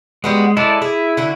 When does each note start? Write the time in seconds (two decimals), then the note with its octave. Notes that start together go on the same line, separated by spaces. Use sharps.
0.24 G3 G#3 B3 F#4
0.57 G#3 E4 A4 D5
0.82 E4 G#4
1.17 D3 F#4